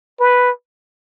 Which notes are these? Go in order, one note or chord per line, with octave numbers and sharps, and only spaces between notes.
B4